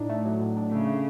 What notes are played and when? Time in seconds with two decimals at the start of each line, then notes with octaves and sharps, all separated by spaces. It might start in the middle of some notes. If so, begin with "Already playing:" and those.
Already playing: A2 D4 D#4
0.09 A3
0.25 F#3
0.40 A2
0.57 D4
0.72 C#3 A3
0.88 A3